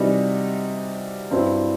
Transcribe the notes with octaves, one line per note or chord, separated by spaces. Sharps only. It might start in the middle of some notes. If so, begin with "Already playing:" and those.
Already playing: C3 E3 G3 D#4 F#4
G2 F#3 C4 E4